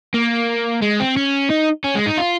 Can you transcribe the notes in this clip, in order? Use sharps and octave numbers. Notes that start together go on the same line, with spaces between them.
A#3
G#3
C4
C#4
D#4
C#4
G#3
D#4
F4